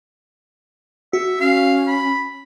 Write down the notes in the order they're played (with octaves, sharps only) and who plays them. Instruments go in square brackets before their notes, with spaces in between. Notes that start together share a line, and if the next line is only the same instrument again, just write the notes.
[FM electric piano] F#4 [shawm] E5
[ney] C#4 [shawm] F5
[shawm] B5